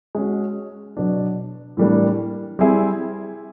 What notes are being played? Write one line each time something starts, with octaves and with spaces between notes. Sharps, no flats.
G#3 C#4 F#4
B2 F#3 B3 D4
A2 E3 G3 A#3 D4
G3 C4 E4 G#4